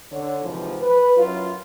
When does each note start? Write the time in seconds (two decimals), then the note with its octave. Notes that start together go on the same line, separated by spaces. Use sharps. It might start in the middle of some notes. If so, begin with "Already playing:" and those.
0.12 D3 C#5
0.43 G#2 C3 E3 F3
0.81 B4
1.16 F#2 F#3 E4 F4